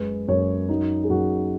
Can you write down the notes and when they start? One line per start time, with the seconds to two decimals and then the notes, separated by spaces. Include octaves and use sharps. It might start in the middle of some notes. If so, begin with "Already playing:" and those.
Already playing: F#2 G#3 B4
0.28 F#2 C#5
0.69 F#3 D#4
1.04 G#4
1.09 F#2 F#4